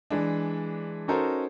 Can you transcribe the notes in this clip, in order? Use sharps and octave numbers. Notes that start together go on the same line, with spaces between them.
E3 G#3 D4
C#4 D#4 F#4 A4 A#4 C5